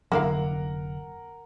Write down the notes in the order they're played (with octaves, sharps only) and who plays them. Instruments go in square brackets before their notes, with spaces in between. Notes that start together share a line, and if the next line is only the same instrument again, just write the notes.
[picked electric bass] F1 D3 F#3 [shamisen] A#3 E4 F5 [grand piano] A#4 F#5